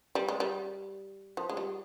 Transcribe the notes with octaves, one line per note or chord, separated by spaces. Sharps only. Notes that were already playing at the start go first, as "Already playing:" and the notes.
G3
G#3
G3
F3
G#3
G3